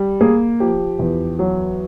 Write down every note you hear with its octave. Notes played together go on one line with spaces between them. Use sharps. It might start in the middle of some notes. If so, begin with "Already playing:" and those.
Already playing: G3
A#3 G#4
F3 G4
E2
F#3